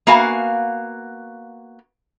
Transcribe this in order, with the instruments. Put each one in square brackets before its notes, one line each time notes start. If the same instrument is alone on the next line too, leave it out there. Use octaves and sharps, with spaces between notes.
[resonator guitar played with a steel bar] A#3 B3 F#4 F5 G#5